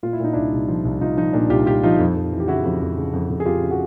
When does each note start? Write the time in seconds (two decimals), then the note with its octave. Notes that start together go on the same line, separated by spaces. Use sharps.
0.03 A#2 F4
0.13 E4
0.20 A#2 D#4
0.33 C2 D4 E4
0.52 C2
0.68 F3
0.85 C2
1.01 C2 D#4 F4
1.17 F3 D#4
1.33 A#2 D4
1.50 C2 F4 G4
1.66 C2 F4 G4
1.83 F3 D#4 F4
1.99 F2
2.15 F2
2.33 E3
2.40 G4
2.48 C#3 E4 F#4
2.64 F2
2.81 F2
2.98 C#3
3.14 F2
3.30 F2
3.40 G#4
3.46 F2 F4 G4
3.63 C#3
3.71 F#4 G#4